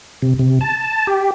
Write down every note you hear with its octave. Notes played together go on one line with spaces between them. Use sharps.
C3
C3
A5
G4